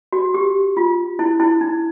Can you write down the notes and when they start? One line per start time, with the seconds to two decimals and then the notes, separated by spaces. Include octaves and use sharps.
0.13 F#4
0.34 G4
0.77 F4
1.19 E4
1.40 E4
1.61 D#4